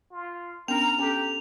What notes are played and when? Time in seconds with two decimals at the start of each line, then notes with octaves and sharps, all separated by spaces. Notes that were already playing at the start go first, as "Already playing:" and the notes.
0.12 F4
0.68 B3 C#4 D4 A#4 A#5 F7
0.99 C#4 G4 A4 A#5